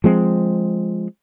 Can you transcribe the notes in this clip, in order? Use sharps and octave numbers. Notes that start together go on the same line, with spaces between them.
F3 G#3 C4